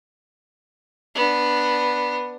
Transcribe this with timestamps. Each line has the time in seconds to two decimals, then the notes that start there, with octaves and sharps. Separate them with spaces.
1.15 B3 D4